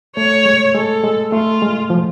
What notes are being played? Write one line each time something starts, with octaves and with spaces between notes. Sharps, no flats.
A3 C#5
G#3
G#3 A4
G#3
A3 F4
G#3
F3